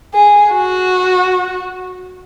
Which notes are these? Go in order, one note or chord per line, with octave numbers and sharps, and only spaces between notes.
G#4
F#4